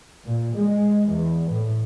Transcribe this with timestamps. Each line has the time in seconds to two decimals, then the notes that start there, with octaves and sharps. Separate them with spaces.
0.24 A#2
0.54 G#3
1.09 E2
1.50 A2